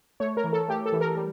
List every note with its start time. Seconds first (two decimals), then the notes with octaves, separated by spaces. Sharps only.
0.20 A3 C#5
0.37 A#4
0.44 E3
0.53 A4
0.68 A3 G4
0.86 A4
0.93 E3
1.01 A#4
1.17 G3